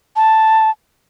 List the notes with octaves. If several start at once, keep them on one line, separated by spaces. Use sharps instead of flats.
A5